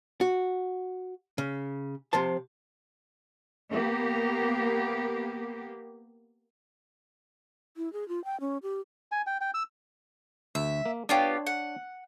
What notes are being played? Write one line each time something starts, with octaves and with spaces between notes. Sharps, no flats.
F#4
C#3
C3 F3 C5 A5
A#3 B3 G4
E4
G#4
F4
G5
C#4
G4
G#5
G5
G5
E6
D2 E5
A#3
B3 D4 F4 G4 C#5 D5
F#5